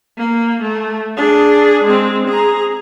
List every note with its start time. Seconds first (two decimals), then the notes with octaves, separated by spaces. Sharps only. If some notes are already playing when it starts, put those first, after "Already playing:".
0.18 A#3
0.62 A3
1.17 D4 G#4
1.84 G#3 C4
2.28 G#4 A#5